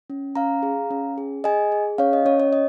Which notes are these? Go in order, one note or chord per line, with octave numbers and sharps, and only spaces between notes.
C#4
C#4 F5 A#5
G#4
C#4
G#4
G#4 D#5 G#5
G#4
C#4 C#5 F5
D#5
C#4 C#5
C#5
D#5